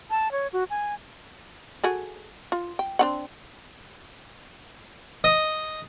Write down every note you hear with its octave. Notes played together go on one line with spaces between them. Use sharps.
A5
C#5
F#4
G#5
F#4 G#4 A4
F4
G5
C4 D4 F#5
D#5